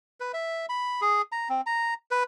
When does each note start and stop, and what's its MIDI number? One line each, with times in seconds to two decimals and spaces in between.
0.20 0.32 71
0.34 0.66 76
0.69 1.01 83
1.01 1.22 68
1.32 1.48 82
1.49 1.61 60
1.66 1.94 82
2.11 2.23 71